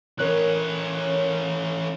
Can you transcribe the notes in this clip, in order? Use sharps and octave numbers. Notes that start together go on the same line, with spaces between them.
E3 C#4 A#4 C#5 F#6